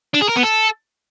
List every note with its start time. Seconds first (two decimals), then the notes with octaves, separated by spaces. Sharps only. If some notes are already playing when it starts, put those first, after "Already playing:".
0.14 D4
0.22 G#4
0.29 A#4
0.37 B3
0.44 A4